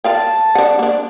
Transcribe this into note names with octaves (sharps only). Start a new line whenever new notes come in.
A#4 F5 G5 A5
D4 F#5
A#3 D4